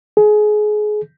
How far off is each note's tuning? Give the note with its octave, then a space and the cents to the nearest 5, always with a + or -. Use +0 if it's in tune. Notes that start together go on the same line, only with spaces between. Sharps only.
G#4 +25